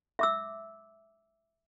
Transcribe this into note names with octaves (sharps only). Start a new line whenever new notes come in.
E5 D6 E6